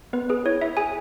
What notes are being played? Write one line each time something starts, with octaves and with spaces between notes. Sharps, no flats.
B3 B4
G#4 B4
E4 C#5
E4 E5
G#4 G#5